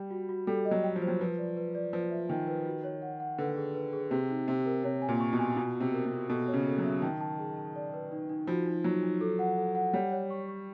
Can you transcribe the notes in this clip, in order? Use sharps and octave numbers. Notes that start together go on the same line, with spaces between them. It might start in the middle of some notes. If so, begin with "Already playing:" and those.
Already playing: G3
F#4
F#4
G3 A4
D#5
F#3
G5
F3
C5
F#3
F3 B4
D5
B4
D5
F3 B4
E5
D#3 G#5
B4
F#4
C#5
F#5
F#5
D3 B4
G#4
B4
G#4
C3 G4
D#4
C3 G4
A#4
C3 C#5
G#5
A#2
C#6
B2
G#5
B2 F4
F4
C3
A#4
C3
F4
B2 A4
C#5
C#3
A4
F#3
E5
D#3 A5
A5
G#4
A5
D5
B4
D#4
D#4
F3 F#4
D#4
F#3 D#4
D#4
A4
F#5
A4
F#5
G3 C#5
C#5
C#6
C#6